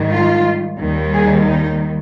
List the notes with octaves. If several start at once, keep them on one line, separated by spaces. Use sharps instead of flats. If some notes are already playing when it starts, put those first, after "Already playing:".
Already playing: G#2 D#3 G3
F4
D#2 D#3 G3
G#4
D#4